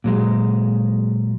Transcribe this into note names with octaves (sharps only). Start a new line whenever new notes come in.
A#2 F#3 G#3